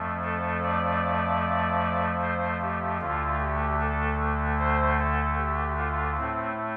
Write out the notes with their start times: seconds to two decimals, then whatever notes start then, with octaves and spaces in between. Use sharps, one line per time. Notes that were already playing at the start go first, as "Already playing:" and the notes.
Already playing: F2 F3 A3
0.24 A4
0.63 D5
2.22 C5
2.62 G4
3.01 D2 D3 A3 F4
3.40 G4
3.81 A4
4.59 C5
4.99 A4
5.38 G4
5.78 F4
6.17 A2 A3 C4